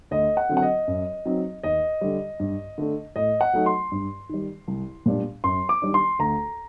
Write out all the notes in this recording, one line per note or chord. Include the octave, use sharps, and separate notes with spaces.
D2 D#5
F#5
D3 F#3 C4
F#5
D#5
F#2
F#3 C4 D#4
D#2 D#5
D3 G3
G2
D3 A3 D4
A2 D#5
F#5
F#3 A3 D#4
C6
G2
D#3 G3
C2
A#2 G3 D4
F#2 C6
D6
D#3 G3 D4
C6
D2 A#5